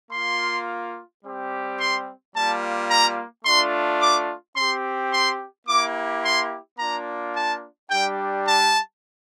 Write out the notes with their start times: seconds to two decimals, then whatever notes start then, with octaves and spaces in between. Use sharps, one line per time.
0.11 A#3 F4 C6
1.23 G3 C4 G4
1.78 C6
2.34 G3 A#3 F4 A5
2.90 A#5
3.44 A3 D4 F4 C6
4.00 D6
4.56 C4 G4 C6
5.11 C6
5.67 A#3 E4 G4 D6
6.23 C6
6.78 A#3 D4 F4 A#5
7.35 A5
7.90 G3 D4 G4 G5
8.45 A5